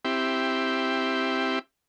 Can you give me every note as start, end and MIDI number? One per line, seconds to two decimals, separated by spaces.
0.05 1.59 60
0.05 1.59 64
0.05 1.59 67